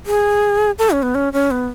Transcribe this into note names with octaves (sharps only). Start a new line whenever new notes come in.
G#4
A4
C#4
B3
C#4
C#4
B3